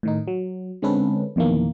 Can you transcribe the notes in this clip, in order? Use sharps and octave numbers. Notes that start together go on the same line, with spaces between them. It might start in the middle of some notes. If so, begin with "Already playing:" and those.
A2 D#3 D#4
F#3
D3 G#3 C4 C#4 A4 B4
F2 B2 D#3 E3 A#3